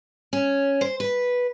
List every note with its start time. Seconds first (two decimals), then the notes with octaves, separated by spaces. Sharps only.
0.33 C#4
0.81 C5
1.00 B4